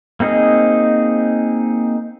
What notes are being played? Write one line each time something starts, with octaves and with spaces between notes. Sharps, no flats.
A#3 C4 D#4 G#4 D#5